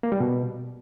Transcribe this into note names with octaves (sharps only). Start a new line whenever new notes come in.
A#3
G3
B2